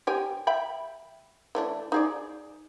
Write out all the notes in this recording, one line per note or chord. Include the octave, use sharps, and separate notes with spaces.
G4 G5 G#5
E5 G5 B5
E3 A3 D4
D#4 G#4 D5